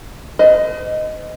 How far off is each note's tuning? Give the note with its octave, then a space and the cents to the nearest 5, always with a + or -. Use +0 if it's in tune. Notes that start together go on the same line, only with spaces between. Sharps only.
C5 -45 D#5 +0